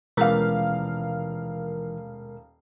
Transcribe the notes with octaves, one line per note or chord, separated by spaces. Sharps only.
D#1 B2 E3 G#3 A#4 F5